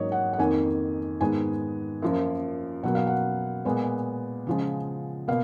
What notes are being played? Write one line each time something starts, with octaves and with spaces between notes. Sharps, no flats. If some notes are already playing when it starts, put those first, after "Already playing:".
Already playing: G#2 F#3 A#3 C#5 D#5
F#5
F#5
F2 D#3 A#3 G#5
G#2 D#3 G#3 B3 G#5
F#2 F3 A#3
B2 F#3 A#3 F#5
F5
F#5
A#2 G#3 B3
C#3 F3 G#3
B2 A#3 F5